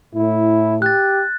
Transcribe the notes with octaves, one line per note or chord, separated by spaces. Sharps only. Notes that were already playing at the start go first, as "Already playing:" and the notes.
A2 E4
G4 F#6 A6